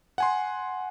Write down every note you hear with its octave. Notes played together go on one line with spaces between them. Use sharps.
F#5 G#5 C6